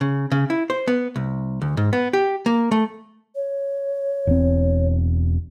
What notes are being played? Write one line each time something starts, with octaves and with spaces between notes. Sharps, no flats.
C#3
C#3
E4
C5
B3
C2
D2
G#2
B3
G4
A#3
A3
C#5
E1 C4